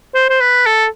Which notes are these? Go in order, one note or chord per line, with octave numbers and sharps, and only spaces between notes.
C5
C5
B4
A4